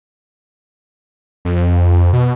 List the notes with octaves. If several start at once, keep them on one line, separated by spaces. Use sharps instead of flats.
F2
B2